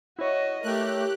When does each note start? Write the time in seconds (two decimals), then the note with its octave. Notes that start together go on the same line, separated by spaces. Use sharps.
0.19 E4 F#4 C#5 D#5
0.63 A3 G4 A#4 F#6